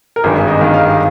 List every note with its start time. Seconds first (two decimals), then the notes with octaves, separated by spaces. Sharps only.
0.16 A#4
0.24 G#1 G2 D#3 G#4
0.36 G#4
0.48 D#5
0.61 G#1 G2 D#3 F5
0.74 F5
0.86 G4